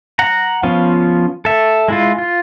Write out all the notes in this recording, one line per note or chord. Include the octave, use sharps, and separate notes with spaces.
F#5 A#5
F3 B3 C#4 F4
A4 E5
G#3 E4 F4
F4